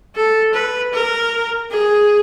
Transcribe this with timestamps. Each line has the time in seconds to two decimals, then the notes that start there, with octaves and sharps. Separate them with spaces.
0.15 A4
0.54 B4
0.93 A#4
1.71 G#4